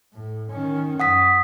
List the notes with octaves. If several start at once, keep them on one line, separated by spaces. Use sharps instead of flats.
A2
D#3 C#4
F#2 F#5 D#6 B6